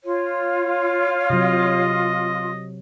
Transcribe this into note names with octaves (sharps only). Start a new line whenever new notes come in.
F4 C#5
C3 F#3 D#5